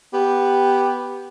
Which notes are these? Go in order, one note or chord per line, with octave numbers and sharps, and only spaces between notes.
B3 G4